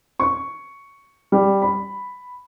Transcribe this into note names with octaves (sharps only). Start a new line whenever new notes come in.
C#6
G3
B5